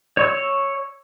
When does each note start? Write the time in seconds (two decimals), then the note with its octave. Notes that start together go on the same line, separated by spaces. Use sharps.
0.17 C#5 C#6 E6